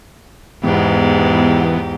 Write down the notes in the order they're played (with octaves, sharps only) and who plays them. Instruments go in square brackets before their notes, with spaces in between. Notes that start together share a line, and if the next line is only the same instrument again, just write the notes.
[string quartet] E2 G4 [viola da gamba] G#2 [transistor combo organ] E3 [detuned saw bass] B3